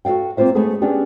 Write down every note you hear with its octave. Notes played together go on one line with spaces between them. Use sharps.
F#4 A4 D5 F5 G5
A#3 C4 F4 C5 E5
G#3 A3 B3 C#4 G#4 A4
B3 C#4 D4 G4 G#4